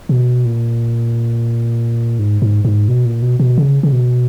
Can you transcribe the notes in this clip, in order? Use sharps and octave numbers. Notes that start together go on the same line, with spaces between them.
B2
A#2
G#2
G#2
G#2
B2
A#2
B2
B2
C#3
C#3
B2